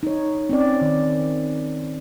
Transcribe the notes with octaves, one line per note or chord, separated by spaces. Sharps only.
D#4 C#5
C4 C#4 D5
D#3